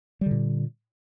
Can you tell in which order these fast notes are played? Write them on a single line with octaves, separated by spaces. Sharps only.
G3 D3 A#2